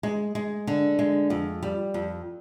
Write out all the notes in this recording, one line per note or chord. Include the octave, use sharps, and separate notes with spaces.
G#3
G#3
D3
G#3
F2
G3
F2